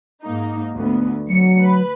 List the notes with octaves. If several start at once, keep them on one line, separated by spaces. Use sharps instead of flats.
G#2 A#3 D#4
D2 B3
D2 F#3 C#7
B4